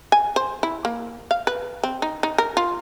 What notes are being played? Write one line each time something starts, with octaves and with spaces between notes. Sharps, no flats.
G#5
C5
E4
A#3
F5
B4
C4
D#4
D#4
A#4
F4